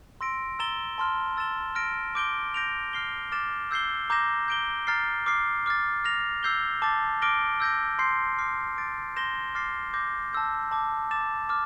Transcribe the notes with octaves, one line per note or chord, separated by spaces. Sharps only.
C6 E6 A#6 D7
A#5 E6 A6 E7 G7
A5 C6 F6
E6 A6 E7 G7
F6 A#6 D7
D6 G6 D7 G7
G6 A#6 D7 F7
F6 C7 G7
D6 F6 A6 E7
E6 G6 C7 G7
A#5 D6 G6 A#6 E7
G6 D7 G7
A#5 F6 A6 C7
D6 F6 C7
D6 F6 A6
F6 A#6 F7
E6 G6 C7 G7
A5 D6 A6
D6 F6 A#6 D7 G7
E6 G6 A#6 D7
C6 G6 C7
D6 F6 C7
D6 A6 D7
C6 G6 A#6 E7 G7
D6 F6 A6 C7
D6 G6 A#6
A5 E6 G6
A5 D6 G6
D6 A6 E7
D6 F6